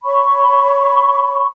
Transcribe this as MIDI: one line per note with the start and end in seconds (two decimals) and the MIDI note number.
0.05 1.46 73
0.05 1.46 83
0.05 1.46 85